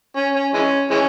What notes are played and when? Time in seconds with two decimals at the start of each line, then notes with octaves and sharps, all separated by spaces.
0.16 C#4
0.35 C#4
0.54 E3 G#3 C#4
0.91 E3 G#3 C#4